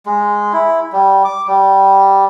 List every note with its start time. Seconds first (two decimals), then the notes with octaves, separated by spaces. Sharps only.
0.06 G#3
0.53 E4
0.93 G3
1.25 D6
1.48 G3